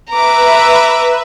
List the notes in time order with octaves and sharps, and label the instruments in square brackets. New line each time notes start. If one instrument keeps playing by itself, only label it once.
[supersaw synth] B4 E5 [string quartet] A#5 D6